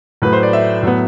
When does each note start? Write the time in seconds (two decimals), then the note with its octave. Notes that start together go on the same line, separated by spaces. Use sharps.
0.22 A2 F#3 A3 B4
0.33 C5
0.43 D5
0.53 E5
0.82 A2 F#3 B3